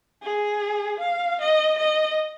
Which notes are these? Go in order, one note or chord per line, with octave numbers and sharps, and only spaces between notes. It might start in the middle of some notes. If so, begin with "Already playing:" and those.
G#4
F5
D#5
D#5